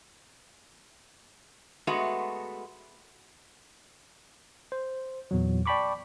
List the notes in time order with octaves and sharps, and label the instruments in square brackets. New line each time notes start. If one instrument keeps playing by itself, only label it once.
[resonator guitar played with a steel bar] G#3 A3 B3 F#4
[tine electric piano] C5
E2 A#2 F#3
D5 G5 A5 B5 C#6 D6